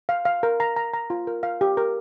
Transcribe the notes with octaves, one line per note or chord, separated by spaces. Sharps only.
F5
F5
A#4
A#5
A#5
A#5
F4
A#4
F5
G4
A#4